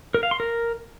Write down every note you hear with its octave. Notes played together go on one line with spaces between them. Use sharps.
A#4
F5
C6
A#4